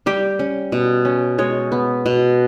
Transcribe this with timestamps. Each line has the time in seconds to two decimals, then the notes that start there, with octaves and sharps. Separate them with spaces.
0.06 G3 G4
0.39 C#4
0.72 B2
1.05 C#4
1.38 G#3 C#5
1.72 B3
2.06 B2